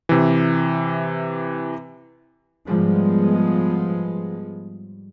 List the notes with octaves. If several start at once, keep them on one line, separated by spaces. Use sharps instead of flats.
C3 E3
G#2 F3 G3 G#3 B3